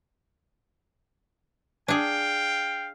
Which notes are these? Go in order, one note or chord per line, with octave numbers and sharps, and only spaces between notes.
D4 G#4 F5 G5